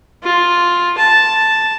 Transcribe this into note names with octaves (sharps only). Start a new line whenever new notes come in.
F4
A5